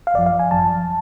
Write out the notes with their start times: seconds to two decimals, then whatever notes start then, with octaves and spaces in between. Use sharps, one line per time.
0.07 F5
0.14 G#1 F#2 F3 D5
0.26 F5
0.39 G#5
0.51 G#1 F#2 F3 A5